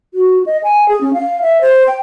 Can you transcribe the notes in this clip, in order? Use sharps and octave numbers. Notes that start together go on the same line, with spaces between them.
F#4
D#5
G#5
G#4
C#4
F5
E5
C5
G5